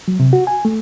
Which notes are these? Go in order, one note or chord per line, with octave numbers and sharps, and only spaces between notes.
F#3
C3
F#4
G#5
A3